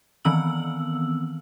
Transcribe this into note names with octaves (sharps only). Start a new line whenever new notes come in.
D#3 E3 B3 C4 E6 F#7